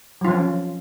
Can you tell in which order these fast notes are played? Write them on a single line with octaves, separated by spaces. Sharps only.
F#3 F4 F3 C#4